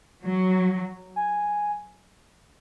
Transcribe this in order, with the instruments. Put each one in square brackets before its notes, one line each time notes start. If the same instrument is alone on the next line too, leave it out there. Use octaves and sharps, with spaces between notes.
[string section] F#3
[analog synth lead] G#5